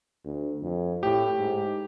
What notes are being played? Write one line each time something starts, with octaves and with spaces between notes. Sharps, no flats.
D2
F2
A2 G4
G#2